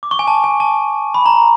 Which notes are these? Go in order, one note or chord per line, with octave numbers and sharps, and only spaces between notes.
D6
C#6
G#5
A5
G#5
A5
B5
A#5